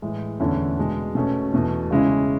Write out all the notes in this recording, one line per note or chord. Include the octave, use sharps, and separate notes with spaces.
A2 E3 G#3
E2 D3 A3 C#4 E4
B2 G#3 D4
B2 A3 C#4
E2 B2 A3
C#3 G#3 C#4 E4